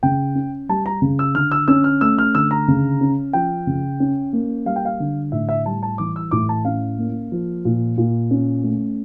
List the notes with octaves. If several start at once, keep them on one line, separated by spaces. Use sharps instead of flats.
C#3 G5
C#4
G3 A5
A#5
C#3
E6
D3 F6
E6
C#4 E6
F6
A3 E6
F6
D3 E6
A#5
C#3
C#4
F3 G5
C#3
C#4
A#3
G3 F5
G5
F5
D3
A2 E5
E5
G3 A5
A5
E3 D6
E6
A2 D6
A5
C#4 F5
A#3
F3
A#2
A#2
C#4
A3